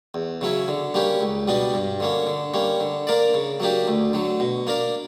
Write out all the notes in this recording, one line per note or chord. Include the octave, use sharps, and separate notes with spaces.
E2
C#3 F#3 C#4 E4
D3
G3 A#3 C#4 G4
C#2
B2 G3 B3 D4
G2
D3 A#3 C#4
D3
G3 A#3 C#4
D3
A#3 D4 A#4 D5
C#3
F#3 A#3 D4 G4
D2
D3 F#3
B2
A#3 D4 A#4